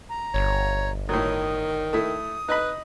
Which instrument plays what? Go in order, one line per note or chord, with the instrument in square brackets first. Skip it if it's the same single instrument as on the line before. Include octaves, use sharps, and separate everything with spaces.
[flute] A#5
[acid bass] G1 [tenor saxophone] C#5
[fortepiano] A2 F#3 [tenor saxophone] D#3 [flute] D#6
[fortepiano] A3 E4 [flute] D#6
[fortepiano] D#4 D#5 B5 [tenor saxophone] B4